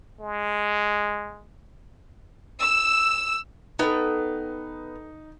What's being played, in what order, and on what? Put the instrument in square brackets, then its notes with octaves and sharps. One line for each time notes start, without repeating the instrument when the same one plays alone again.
[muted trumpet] G#3
[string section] E6
[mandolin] B3 [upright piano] D#4 [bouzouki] A4 B4 G5